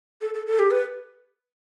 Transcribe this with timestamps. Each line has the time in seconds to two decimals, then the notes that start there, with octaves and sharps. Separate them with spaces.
0.21 A4
0.34 A4
0.47 A4
0.59 G4
0.71 B4